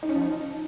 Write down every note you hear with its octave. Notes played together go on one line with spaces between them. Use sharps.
D#4
C#4
F3
D#4